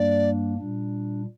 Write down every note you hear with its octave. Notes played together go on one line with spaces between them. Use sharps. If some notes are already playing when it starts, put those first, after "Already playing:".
Already playing: G2 G3 A#3 D4 D5
A#2 G3 D4